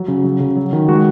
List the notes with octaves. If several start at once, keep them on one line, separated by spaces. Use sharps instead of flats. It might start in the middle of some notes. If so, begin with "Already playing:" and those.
Already playing: F#3
C#3
F#3
C#3
F#3
D#3
G#3 F#4